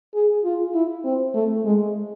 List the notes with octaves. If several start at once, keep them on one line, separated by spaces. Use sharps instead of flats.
G#4
F4
E4
C4
A3
G#3